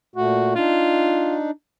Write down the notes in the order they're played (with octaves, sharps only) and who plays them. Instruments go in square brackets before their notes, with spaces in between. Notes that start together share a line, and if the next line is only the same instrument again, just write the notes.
[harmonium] A#2 A3 [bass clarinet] F#4
[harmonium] D4 D#4 [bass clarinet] F4